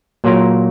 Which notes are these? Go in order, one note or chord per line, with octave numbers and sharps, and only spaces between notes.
A#2 F#3 A#3 F4 A#4